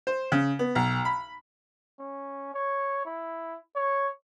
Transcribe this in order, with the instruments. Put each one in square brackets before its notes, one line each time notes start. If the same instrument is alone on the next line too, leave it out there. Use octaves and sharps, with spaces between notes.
[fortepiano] C5
C#3
B3
B1
B5
[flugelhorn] C#4
C#5
E4
C#5